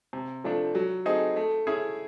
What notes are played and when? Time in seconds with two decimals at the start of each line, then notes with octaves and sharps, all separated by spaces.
0.13 C3
0.44 F3 A3 D4
0.75 F#3
1.06 A3 C4 D#4 G#4
1.36 A3
1.67 C#4 E4 G#4